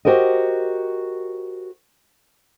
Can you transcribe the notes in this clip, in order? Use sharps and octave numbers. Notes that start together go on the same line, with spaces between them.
F#4 G4 A#4 C5 D#5